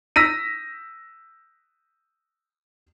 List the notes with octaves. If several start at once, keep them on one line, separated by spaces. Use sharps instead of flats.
E6 A#6 B6 D#7